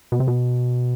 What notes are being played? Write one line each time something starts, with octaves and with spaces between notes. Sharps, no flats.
B2
C3
B2